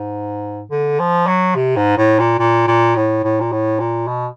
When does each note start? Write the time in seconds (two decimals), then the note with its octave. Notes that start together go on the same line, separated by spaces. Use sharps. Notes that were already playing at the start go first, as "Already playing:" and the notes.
Already playing: G#2
0.71 D3
0.99 F3
1.27 F#3
1.55 C3
1.76 G#2
1.98 A2
2.19 A#2
2.39 A#2
2.67 A#2
2.96 A2
3.24 A2
3.40 A#2
3.52 A2
3.79 A#2
4.08 B2